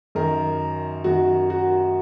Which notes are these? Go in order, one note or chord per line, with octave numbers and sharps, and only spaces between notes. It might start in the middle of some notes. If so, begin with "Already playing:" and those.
F#2 D#3 A#4
F#2 D#3 F#4
F#4